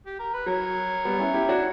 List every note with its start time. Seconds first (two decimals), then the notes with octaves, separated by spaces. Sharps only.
0.06 G4
0.19 A#4
0.33 B4
0.46 F#3 A#4 C#5
1.05 G3 B3
1.19 C#4 E4
1.34 E4 G4
1.49 D4 F#4